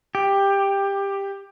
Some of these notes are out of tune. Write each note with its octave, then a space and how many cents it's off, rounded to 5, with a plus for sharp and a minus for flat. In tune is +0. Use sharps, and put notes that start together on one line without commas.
G4 +15